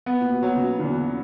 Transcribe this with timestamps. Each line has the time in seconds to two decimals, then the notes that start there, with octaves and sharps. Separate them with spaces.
0.06 B3
0.21 A#2
0.31 B2
0.43 F#3
0.56 C#3
0.79 E2 D3